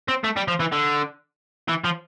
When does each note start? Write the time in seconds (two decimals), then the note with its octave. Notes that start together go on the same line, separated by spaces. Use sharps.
0.08 C4
0.24 A3
0.36 G3
0.48 F3
0.60 E3
0.72 D3
1.68 E3
1.84 F3